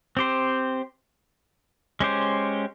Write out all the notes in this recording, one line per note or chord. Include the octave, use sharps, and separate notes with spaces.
C4 G4 C5
G#3 C#4 G4 C5